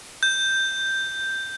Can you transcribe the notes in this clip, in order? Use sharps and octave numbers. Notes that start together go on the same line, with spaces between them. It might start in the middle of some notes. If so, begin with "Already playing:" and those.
G6